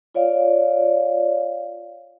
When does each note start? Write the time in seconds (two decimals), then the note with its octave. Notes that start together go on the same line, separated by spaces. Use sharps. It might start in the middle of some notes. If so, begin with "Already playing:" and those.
0.14 F4 C#5 D5 F5